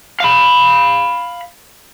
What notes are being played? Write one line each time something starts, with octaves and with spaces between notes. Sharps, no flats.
F5 B5